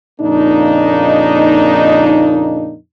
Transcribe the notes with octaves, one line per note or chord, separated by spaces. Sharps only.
F2 A#2 C#3 A#3 D4 D#4